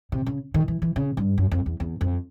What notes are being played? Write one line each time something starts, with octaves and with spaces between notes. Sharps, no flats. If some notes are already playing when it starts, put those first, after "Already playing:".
C3
C#3
D#3
E3
E3
C#3
G2
F#2
F2
E2
E2
F2